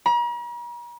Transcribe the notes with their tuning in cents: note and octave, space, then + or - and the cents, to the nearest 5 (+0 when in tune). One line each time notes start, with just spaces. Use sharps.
A#5 +45